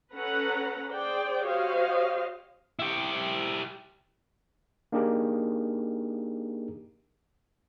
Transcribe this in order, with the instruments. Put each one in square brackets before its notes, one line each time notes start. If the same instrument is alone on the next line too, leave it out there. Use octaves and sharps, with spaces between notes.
[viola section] C#4 A4 B4 F#5 A#5
G#4 C5 D5 G5
F#4 G4 C5 C#5 D#5 F5
[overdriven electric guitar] E4 G4
[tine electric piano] A#3 D4 D#4 G4 G#4 A#4